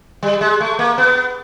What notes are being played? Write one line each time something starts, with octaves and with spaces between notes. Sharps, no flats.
G3
G#3
A3
A#3
B3